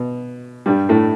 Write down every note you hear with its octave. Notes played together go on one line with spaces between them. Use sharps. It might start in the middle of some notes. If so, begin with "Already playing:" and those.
Already playing: B2
G2 G3
A2 A3